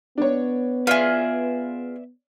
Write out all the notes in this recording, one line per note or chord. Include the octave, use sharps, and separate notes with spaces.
B3 D4 C#5
F4 G#4 B4 D5 E5